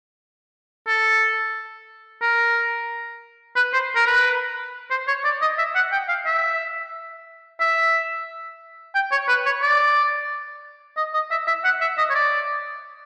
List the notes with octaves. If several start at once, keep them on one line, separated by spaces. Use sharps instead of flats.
A4
A#4
B4
C5
A#4
B4
C5
C#5
D5
D#5
E5
F#5
G5
F5
E5
E5
G5
C#5
B4
C#5
D5
D#5
D#5
E5
E5
F#5
E5
D#5
C#5
D5